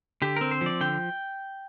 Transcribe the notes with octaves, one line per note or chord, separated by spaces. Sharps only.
D3 G4
C4 A#4
C5
F3
D5
D3 G5